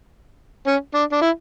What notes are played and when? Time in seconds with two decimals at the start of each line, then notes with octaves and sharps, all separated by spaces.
0.67 C#4
0.94 D4
1.12 D4
1.21 E4